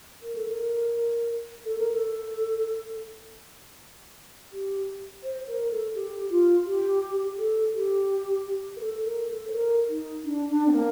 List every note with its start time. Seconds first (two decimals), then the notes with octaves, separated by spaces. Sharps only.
0.22 A#4
0.35 A4
0.48 A#4
1.65 A4
1.78 A#4
1.91 A4
4.52 G4
5.23 C5
5.48 A#4
5.71 A4
5.95 G4
6.31 F4
6.66 G4
7.38 A4
7.74 G4
8.76 A#4
8.81 A4
9.05 A#4
9.29 A4
9.48 C5
9.52 A#4
9.89 D#4
10.25 D4
10.49 D4
10.68 C4
10.72 A#3